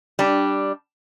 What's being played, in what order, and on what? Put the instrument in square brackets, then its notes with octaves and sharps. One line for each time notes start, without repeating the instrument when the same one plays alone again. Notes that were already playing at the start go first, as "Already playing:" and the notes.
[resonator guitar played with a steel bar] G3 D4